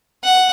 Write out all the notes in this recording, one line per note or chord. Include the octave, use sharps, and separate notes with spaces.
F#5